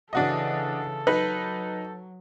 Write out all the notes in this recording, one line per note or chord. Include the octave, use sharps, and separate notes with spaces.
C#3 E3 D4 F#4 A4 D#5
F#3 D#4 B4